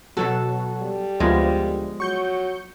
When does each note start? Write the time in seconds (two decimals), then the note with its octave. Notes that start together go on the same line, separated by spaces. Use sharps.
0.17 B2 F#3 F#4 A4
0.82 G3
1.20 D2 F3 G#3 B3 F4
2.00 F#3 C#6 G6 C#7